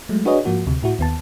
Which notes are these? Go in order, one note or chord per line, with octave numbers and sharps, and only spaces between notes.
F#3 G#3 A3
D4 F#4 G#4 B4 C#5 D#5
G#2 F3 A#3 F#4
D2 C3
A2 E4 F#4
D#2 B3 A5